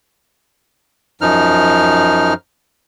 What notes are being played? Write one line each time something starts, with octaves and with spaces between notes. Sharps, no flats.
F#2 F3 D#4 F6